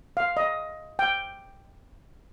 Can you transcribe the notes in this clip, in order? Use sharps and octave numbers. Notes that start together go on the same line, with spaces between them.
F5
D#5
G5